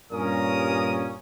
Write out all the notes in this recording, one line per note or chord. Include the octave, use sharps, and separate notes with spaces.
G2 A#2 C#4 A#4 D#6